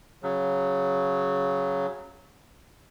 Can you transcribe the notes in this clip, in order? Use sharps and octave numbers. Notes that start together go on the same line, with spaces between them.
C#3 F#3